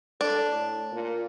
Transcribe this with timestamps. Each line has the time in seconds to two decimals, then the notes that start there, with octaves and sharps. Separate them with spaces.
0.21 D4 A4
0.51 A2
0.92 A#2